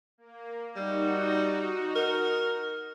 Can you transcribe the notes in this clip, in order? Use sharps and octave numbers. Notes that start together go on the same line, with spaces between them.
A#3
G3 D#4 F#4
A#4